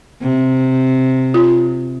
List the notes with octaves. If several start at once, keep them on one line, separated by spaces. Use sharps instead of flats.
C3
F4